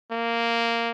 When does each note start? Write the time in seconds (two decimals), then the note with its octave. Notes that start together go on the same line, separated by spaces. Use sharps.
0.12 A#3